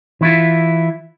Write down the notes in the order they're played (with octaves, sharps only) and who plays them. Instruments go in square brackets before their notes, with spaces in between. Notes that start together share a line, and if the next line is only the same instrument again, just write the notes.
[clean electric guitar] E3 E4 F4